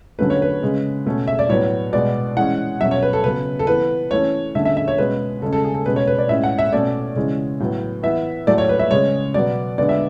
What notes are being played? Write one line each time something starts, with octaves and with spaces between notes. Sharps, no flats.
D3 F#3 A3 C#4 B4
C#5
B4
C#3 G#3 C#4
B2 A3 C#4
E5
D5
A2 F#3 B3 C#5
B2 G#3 B3 D5
E3 G#3 C#4 F#5
B2 F#3 C#4 E5
C#5
B4
A4
C#3 F#3 B3 B4
A4
E3 B3 B4
E3 A3 C#4 C#5
D3 A3 C#4 E5
E5
E5
C#5
B2 G#3 C#4 B4
C#3 G#3 C#4 A4
A4
G#4
A4
B2 G#3 C#4 B4
C#5
B4
D5
A2 G#3 C#4 E5
F#5
E5
B2 A3 C#4 D5
C#3 E3 G#3 C#4
A2 F#3 B3
E3 B3 E5
A2 F#3 A3 D5
C#5
B4
E5
C#3 G#3 C#4 C#5
B2 F#3 B3 D5
D3 G#3 B3 D5
E5